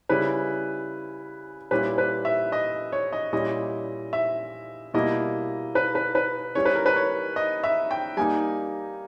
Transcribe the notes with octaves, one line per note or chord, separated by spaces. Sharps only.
C#3 G3 C#4 E4 B4
A#2 G3 C#4 E4 B4
B4
E5
D#5
C#5
D#5
A#2 G3 C#4 E4 D#5
E5
B2 G3 A#3 E4 D#5
B4
B4
B4
G3 C#4 E4 C#5
B4
A#4
B4
C#5
D#5
E5
G5
G3 A#3 D#4 G#5